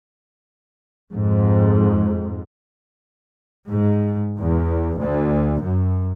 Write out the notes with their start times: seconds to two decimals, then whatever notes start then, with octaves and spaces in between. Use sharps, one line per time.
1.13 F2 G#2
3.69 G#2
4.38 E2
4.98 D2
5.62 F#2